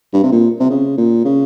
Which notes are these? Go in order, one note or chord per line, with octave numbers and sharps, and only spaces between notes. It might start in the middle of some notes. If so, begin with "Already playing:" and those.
G2
C3
A#2
C3
C#3
A#2
C#3